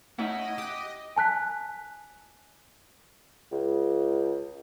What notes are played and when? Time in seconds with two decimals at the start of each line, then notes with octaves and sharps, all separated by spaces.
0.19 A3 C#4 D#4 E4 D#5 F#5
0.58 G4 D6 D#6 F#6
1.16 G#5 A5 F#6 B6
3.52 C#2